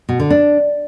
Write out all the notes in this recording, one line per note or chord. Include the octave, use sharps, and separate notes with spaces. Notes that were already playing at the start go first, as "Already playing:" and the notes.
B2
D3
D4